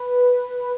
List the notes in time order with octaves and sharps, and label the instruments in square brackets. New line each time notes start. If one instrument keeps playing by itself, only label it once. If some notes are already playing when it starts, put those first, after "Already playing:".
Already playing: [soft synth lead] B4